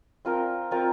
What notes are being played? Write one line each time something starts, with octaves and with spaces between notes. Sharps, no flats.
C4 F4 A#4
C4 F4 A#4